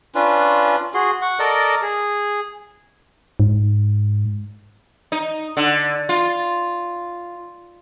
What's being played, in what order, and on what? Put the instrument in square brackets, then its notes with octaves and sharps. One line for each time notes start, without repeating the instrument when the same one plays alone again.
[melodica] C#4 D4 F4 B4
F#4 G#4 C6
F#5 C#6
A4 A#4 D5 D#5
G#4
[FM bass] G#2
[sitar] D#4
D3
F4